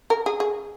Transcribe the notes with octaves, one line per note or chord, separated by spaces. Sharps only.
A#4
G#4
G#4